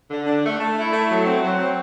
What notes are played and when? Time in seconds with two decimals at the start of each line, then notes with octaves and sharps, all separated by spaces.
0.10 D3
0.26 D4
0.44 A3
0.60 A3
0.77 E4
0.93 A3
1.09 F#3
1.26 C4
1.42 F#3
1.59 C4